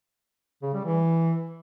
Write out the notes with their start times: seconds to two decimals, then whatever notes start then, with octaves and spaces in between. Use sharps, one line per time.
0.62 C#3
0.73 G3
0.85 E3